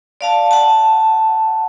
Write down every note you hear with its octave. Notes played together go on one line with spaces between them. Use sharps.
D5 F5 A5
F#5 A5